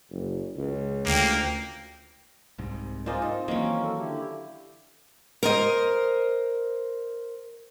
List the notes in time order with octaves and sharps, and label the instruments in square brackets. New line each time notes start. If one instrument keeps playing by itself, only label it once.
[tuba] F#1
C#2
[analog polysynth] D2 G5 [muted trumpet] A#3
[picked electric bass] C2 G#2 C3
[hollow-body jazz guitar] G#3 C5 G#5 [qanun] F4 [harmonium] A#4 D5 D#5
[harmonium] C4 [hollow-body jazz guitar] D#4
[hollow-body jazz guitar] D#3 [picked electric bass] E3 F#3 [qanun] A#3 C#4
[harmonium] A4
D3 E4 G4
[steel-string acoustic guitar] A#4 C5 D#5